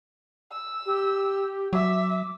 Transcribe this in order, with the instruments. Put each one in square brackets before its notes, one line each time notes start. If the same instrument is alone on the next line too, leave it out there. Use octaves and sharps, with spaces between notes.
[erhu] E6
[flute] G4
[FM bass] F#3 [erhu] E5 [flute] D6